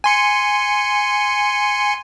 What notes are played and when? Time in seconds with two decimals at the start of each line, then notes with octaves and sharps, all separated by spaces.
0.04 G#5 C6 C#7